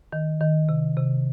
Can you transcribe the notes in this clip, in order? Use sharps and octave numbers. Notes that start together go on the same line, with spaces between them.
D#3
D#3
C3
C3